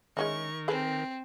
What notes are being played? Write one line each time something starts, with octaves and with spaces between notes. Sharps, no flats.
D#3 G#3 C#4 E4 A#4 C#6
C4 G#4 A4 B4